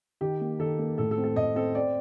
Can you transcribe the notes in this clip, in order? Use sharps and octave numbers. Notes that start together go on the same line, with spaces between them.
D#3 G4
A#3
D#3 A4
A#3
A2 A4
A4
C4
A4
A2 D#5
C4 A4
C4 D5